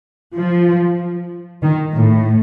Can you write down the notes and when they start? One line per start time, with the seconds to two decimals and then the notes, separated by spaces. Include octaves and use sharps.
0.37 F3
1.63 D#3
1.94 A2